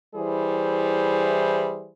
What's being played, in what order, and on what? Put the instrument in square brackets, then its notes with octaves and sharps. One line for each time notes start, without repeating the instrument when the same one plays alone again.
[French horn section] E3 G3 E4 G#4 C5